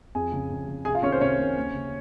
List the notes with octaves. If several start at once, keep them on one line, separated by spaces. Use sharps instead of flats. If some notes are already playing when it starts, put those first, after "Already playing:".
F2 G#4 G#5
C#3
F2
C#3
C2 G#4 G#5
F4 F5
C3 D#3 C#4 C#5
C5
C2 C#4 C#5
C3 D#3
D#2
C#3